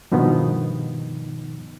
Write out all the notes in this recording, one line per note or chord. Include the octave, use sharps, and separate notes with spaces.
G2 B2 D#3 F3 B3 D#4